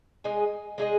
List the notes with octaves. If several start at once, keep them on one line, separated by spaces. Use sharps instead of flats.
G#3 D#4 G#4 D#5
G#3 D#4 G#4 D#5